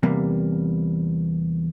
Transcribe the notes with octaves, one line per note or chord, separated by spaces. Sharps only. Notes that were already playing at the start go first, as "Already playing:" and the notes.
E2 C3 G3 A#3